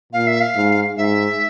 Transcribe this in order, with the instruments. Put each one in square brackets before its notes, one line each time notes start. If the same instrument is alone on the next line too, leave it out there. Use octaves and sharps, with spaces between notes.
[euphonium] A#2 [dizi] F5
[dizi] E5
F5
[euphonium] G#2
[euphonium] G#2 [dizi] E5